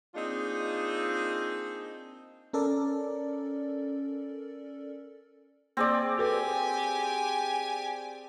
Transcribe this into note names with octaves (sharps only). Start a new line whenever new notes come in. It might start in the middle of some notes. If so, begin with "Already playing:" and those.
A#3 C4 D4 D#4 F4 G#4
C#4 A4 A#4 D5
A#3 C4 G#4 D5
F#4 G4 A4 B4 G#5